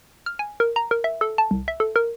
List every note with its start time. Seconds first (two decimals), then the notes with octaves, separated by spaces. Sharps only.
0.26 F6
0.39 G#5
0.60 A#4
0.76 A#5
0.91 A#4
1.04 E5
1.21 A4
1.38 A5
1.51 C2
1.68 E5
1.80 A4
1.96 A#4